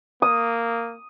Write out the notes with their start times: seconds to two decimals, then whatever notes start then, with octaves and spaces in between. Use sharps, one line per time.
0.22 A#3 D#6